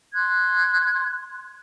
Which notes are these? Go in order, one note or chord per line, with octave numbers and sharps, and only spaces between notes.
C6 F#6 G#6